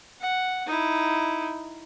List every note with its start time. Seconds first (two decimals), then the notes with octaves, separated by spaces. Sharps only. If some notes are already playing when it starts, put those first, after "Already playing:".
0.20 F#5
0.66 D#4 E4